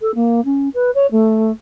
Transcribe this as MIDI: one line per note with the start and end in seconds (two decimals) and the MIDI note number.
0.01 0.15 69
0.15 0.44 58
0.45 0.69 61
0.74 0.91 71
0.95 1.07 73
1.11 1.52 57